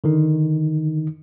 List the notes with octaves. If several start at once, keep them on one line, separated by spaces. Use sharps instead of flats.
D3 D#3 D#4